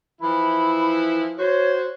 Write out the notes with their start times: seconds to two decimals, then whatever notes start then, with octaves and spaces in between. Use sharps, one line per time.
0.22 E3 F3 E4 B5
1.38 F#4 C5 C#5